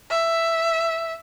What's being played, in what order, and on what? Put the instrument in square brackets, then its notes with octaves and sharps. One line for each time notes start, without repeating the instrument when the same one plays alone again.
[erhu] E5